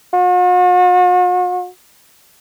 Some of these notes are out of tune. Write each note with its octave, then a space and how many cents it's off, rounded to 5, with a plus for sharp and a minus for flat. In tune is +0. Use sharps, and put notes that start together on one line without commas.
F#4 -45